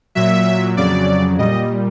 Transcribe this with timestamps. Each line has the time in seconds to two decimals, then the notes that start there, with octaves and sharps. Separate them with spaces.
0.15 A#2 F#3 E5
0.77 F2 C#3 F#3 D5
1.39 A#2 G3 D#5